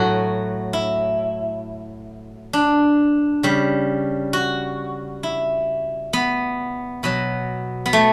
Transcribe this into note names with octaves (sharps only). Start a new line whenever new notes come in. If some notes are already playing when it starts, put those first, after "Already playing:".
Already playing: A2 F#3 F#4
E4
D4
C#3 G3
F#4
E4
B3
B2 F#3 B3
B3
A3